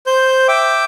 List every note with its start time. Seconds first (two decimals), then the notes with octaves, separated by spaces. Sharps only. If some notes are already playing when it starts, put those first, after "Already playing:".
0.07 C5 G6
0.48 E5 G5 D6